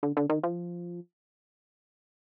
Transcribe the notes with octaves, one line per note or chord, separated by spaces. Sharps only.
D3
D3
D#3
F3